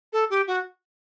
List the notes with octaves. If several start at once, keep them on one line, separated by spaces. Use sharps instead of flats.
A4
G4
F#4